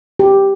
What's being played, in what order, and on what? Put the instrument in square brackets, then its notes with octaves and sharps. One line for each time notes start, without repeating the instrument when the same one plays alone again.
[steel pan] G4